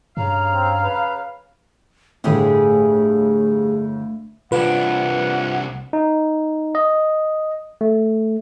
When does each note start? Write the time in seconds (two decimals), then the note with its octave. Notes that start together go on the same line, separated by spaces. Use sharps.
0.17 G2 C#3 F5 A#5
0.53 C4
0.83 B4
2.24 G1 A2 G#3 A3 G4 G#4
4.52 C2 D4 F4 B4 F#5
5.93 D#4
6.75 D#5
7.81 A3